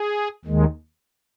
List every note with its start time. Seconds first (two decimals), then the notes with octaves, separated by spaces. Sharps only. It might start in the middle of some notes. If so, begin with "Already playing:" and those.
Already playing: G#4
0.45 D#2 D#3 G#3